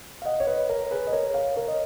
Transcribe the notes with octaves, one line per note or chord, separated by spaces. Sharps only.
F5
D#5 F#5
C#5
B4 D#5
A#4 C#5
G#4 B4
D#5
A#4 C#5
C#5 F5
A#4 C#5
D#5